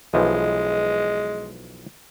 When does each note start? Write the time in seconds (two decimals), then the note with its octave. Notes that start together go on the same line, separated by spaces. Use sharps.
0.14 B1 E3 F3 G#3